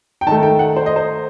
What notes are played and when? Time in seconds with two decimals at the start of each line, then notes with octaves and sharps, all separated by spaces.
0.21 G5
0.27 D#3 A3 A5
0.43 G5
0.59 F#5
0.76 C5
0.86 D#5
0.96 C5